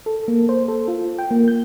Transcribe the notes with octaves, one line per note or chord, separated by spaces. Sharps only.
A4
A#3
C5
A4
F4
G5
A#3
G6